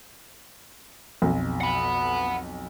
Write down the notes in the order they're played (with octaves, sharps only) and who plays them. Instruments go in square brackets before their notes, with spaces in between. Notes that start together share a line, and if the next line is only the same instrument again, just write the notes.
[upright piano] B1 F2
[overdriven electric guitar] F#5 B5